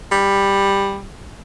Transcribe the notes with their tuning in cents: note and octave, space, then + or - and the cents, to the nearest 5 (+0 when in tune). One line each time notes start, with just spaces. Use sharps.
G3 +10